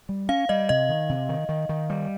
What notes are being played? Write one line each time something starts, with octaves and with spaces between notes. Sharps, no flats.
G3
C#4 F5
G3 D#5
C3 D#5
D#3
C3
D#3
D#3
D#3
G3